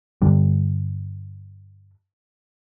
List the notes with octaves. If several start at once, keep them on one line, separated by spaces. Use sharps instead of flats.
G2 D3 G3